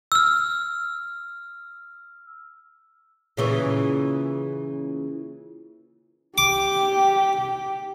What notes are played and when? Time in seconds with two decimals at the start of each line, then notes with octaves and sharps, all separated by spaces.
0.12 E6 F6
3.37 A#2 C#3 E3
6.38 G4 D6